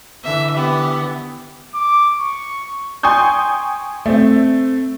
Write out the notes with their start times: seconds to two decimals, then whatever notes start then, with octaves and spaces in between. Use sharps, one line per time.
0.24 D3 E3 E5
0.56 B3 G4
1.74 D6
2.19 C#6
3.03 G5 G#5 C6 C#6 D#6 G6
4.06 A3 C4